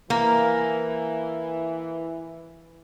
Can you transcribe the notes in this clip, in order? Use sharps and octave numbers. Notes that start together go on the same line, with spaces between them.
E3 A#3